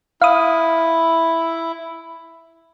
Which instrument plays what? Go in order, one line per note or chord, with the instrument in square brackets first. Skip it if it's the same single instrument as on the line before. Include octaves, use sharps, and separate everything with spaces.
[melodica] E4 [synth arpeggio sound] F5 D#6